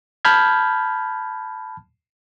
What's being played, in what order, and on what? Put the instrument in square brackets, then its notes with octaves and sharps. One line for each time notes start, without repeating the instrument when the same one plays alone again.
[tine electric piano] A5 B5 F6 G6 G#6